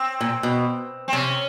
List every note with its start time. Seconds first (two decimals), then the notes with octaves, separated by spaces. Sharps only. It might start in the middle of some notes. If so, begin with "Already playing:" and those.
Already playing: C4
0.21 A#2
0.43 B2
1.08 C4
1.13 C3 C#4